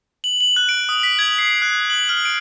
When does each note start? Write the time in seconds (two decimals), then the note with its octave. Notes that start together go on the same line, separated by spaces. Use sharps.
0.24 F#7
0.41 F#7
0.56 F#6
0.69 D7
0.89 D#6
1.03 B6
1.19 G#6
1.39 C7
1.62 F#6
1.90 F#7
2.09 F6
2.25 D7